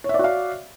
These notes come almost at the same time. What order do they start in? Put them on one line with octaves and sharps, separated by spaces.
C#5 E5 D5 F#4 F5